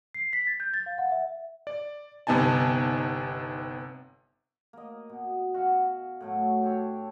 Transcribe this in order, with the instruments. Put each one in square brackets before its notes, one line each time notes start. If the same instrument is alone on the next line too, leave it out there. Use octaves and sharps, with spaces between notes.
[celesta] C7
B6
A6
G6
A6
F5
F#5
E5
[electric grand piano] D5
G1 C3 B3 D#4 G#5 A5
[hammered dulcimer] A#3 D#5
B2
F#4 F5 F#5 G#5
A2 F#3 A3
D4 G4 A4 C#5